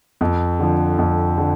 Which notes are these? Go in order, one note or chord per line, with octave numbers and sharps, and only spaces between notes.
F2
D3 F3
F2
D3 F3